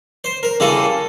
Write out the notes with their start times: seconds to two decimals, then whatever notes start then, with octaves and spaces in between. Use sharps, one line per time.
0.24 C5
0.43 A#4
0.60 F#2 C#3 E3 G3 A#3 A4